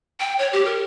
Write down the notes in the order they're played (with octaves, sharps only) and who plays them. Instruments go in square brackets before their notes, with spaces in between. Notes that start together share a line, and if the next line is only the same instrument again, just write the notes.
[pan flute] G5
C#5
G4
A#4